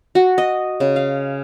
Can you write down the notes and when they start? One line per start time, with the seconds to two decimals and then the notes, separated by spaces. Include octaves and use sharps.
0.15 F#4
0.38 D#5
0.80 C#3
0.96 F5